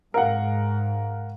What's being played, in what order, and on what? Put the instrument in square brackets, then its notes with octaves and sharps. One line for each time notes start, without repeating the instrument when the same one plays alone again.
[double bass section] G#2 [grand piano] A#4 F5 F#5